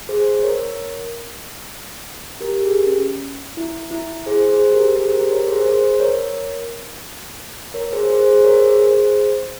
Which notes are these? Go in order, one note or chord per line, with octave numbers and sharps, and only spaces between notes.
G#4 C5
A#4 C#5
G4 A#4
G4
G#4
C#4
E4
E4
G#4 C5
G#4 C5
G4 A#4
G#4 C5
G4 A#4
A#4 C#5
G#4 C5
G#4 C5
A#4 C#5
A#4 C#5
G#4 C5
G#4 C5
G#4 C5
A#4 C#5
G#4 C5
G#4 C5